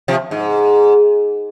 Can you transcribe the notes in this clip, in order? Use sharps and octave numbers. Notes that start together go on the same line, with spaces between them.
C3 F3
G#2